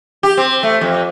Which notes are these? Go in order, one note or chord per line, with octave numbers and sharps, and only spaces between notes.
G4
C4
A3
F2